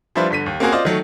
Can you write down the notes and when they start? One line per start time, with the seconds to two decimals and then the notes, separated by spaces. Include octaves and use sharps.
0.15 F3 G3 D4 E4 B4 C5
0.31 G1 D3 B6 D#7
0.46 D#2
0.60 A#3 C4 C#4 F#4 G#4 A#4
0.72 F4 C5 D5 D#5
0.85 D#3 F#3 A3